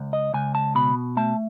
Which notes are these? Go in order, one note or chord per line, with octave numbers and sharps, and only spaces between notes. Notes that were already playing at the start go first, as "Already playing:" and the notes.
Already playing: C#2
D#5
C#2 G#5
A5
B2 B5
A3 A5